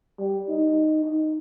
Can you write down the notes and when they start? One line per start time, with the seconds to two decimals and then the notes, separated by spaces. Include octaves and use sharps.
0.18 G3
0.49 D#4
1.04 D#4